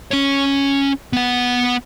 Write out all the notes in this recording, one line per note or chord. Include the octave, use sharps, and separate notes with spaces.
C#4 C#5
B3 F#5